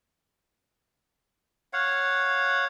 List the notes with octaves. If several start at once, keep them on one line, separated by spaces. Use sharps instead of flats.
C#5 F5 F#5